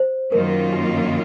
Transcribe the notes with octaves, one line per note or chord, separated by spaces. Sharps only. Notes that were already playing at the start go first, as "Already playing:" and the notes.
Already playing: C5
F#2 D#3 A#3 F4 A#4
F#4